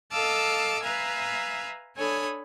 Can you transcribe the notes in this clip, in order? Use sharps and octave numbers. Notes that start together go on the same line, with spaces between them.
A4 D#5 F5 A5 D6 E6
B4 E5 F5 G#5 A#5
D4 A4 C#5 G#5 B5 D#6